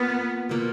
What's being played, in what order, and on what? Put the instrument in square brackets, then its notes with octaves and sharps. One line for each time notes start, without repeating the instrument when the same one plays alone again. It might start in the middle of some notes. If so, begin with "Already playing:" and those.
Already playing: [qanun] A#3 F4 B4 [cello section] B3
[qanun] B2 A#3 F4